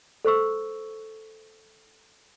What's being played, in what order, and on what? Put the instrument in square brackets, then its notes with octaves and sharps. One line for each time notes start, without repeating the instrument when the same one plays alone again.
[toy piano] A4 C5 C#6 E6